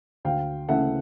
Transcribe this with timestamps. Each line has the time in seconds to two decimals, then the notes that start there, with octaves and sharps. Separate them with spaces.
0.25 D2 F5 G5
0.69 C#3 E3 A3 E5 F#5